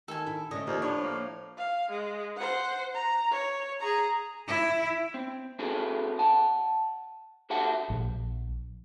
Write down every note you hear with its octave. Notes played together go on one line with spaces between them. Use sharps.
D#3 A4 G#5
E4
D3 A3 C#4 D#5
D#2 F3 A#3
A2 D4 C#5
A#3
F5
G#3
C5 F#5
A#5
C#5
G#4 A#5
E4
C4
C4 F#4 G#4 A4 B4
F#5 A5
F#4 G4 A4 E5 F#5
A#1